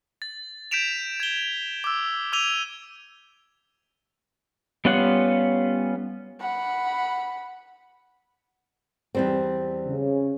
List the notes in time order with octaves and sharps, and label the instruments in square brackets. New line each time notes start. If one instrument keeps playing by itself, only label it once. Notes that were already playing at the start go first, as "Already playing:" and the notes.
[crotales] A6
G6 B6 D7 E7 F7
G#6 G7
D6 E6
D6 E6 G#6 D#7 F7 G7
[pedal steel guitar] G3 B3 C#4 F4 F#5
[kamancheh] F#5 B5
[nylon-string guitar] E2 G3 C4
[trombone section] C#3